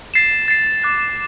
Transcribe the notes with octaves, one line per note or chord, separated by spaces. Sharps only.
A6 C7 E7
A6 C7 E7
D6 F#6 A6